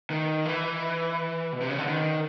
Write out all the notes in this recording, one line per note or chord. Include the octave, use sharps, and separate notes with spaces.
D#3
E3
B2
C3
C#3
D3
D#3